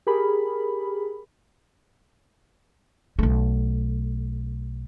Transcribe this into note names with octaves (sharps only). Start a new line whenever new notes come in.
G4 G#4 A#4 B5
B1 A3